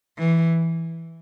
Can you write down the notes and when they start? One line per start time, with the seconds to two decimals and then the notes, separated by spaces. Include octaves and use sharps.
0.19 E3